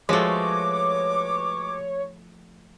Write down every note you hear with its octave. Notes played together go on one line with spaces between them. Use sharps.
F3 G#3 A3 F#4 B4 C#5 D6